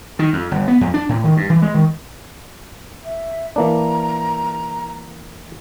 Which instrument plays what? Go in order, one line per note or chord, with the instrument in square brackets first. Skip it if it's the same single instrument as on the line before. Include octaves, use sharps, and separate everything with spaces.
[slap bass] D#3
F2
G1
B3
F2
D4
A2
D#3
G2
E3
G#3
D#3
[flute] E5
[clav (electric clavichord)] E3 A#3 D4 [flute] A#5